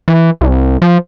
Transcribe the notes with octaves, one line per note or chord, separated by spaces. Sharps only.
E3
C2
F3